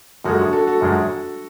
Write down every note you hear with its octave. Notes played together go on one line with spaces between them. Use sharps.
F#2 F3 G#3 F#4 A4
D4 F#4
F#4 A4
F#4 A4
F#2 F3 G#3 D4